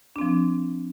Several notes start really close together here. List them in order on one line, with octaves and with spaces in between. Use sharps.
D4 C4 F3